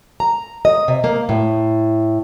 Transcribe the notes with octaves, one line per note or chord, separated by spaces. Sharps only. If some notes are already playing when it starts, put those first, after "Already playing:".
A#5
D#5
C3
A#3
A2